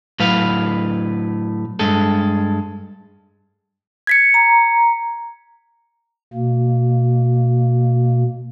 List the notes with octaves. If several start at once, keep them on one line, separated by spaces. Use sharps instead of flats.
A2 F#3 B4 F5
G2 G#3 A4
G#6 B6 C#7
A#5
B2 A#3